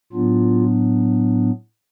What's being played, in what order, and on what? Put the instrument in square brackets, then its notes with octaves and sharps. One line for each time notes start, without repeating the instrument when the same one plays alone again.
[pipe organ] A2 F#3 B3 D4 F4